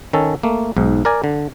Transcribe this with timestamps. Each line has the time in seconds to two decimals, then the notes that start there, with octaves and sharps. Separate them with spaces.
0.13 D#3 C#4 A4
0.43 A3 A#3
0.77 B1 G#2
1.05 A#4 D5 G#5
1.24 D3